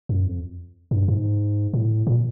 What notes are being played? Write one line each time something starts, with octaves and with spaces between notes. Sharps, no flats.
F#2
F2
G2
G#2
A2
A#2